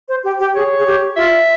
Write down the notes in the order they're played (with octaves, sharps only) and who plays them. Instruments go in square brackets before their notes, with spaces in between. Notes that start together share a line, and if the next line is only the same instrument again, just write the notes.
[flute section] C5
G4 G5
G4 G5
[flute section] G#4 [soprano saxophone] C#5
[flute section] G#4
G4
[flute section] F4 [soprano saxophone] E5